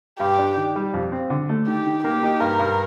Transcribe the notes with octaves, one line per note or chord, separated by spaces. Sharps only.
G2 G4
D4
D#3
G3
F2
C4
D3
A3
D#3 G4
D#3
A#3 G4
D#4
G2 A#4
G2